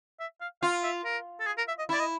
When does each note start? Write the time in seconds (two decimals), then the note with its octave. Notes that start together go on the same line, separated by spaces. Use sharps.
0.20 E5
0.41 F5
0.62 F4 F5
0.83 E5
1.05 A#4
1.40 A4
1.47 G#4
1.58 A#4
1.68 E5
1.79 D#5
1.89 E4 D5
2.00 D#5